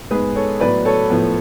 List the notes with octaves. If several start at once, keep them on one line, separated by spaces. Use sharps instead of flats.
G#2 G#3 B3 G#4 B4
A4 C#5
A2 F#3 B3 B4 D5
A4 C#5
A2 F3 B3